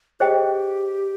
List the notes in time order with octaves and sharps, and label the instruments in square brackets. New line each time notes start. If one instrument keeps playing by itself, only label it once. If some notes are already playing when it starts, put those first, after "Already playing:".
[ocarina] G4 [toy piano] G#4 C5 D#5 G5